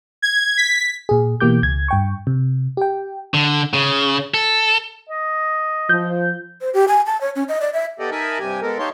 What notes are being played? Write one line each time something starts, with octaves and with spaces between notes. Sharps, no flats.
G#6
B6
A#2 G#4
B2 E3 A#3 G4 D6 G6
C#2 G#6
G2 G5 C#6
C3
G4 G5
D3
C#3
A4
D#5
F3 G6
C5
G4
G#5
A5
C#5
C#4
D#5
D5
E5
B3 G4 A4 D5 D#5
D#4 A#4 E5 G#5 A5 B5
G2 C3 G4 G#5
G#3 B3 A4 A#4
D#4 G4 C#5 F5 A5 C6